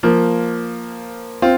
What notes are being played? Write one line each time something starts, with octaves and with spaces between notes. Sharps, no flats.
F3 A#3
C4 F4